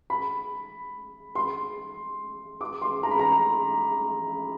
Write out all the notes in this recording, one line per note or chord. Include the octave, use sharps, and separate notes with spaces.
B5
C6
D6
C6
A#5
B5
A#5